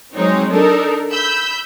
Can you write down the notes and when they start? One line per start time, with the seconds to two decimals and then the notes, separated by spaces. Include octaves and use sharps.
0.14 F#3 G#3 C4 D#4 C#5
0.51 D4 D#4 A4 A#4
1.11 B5 E6 G6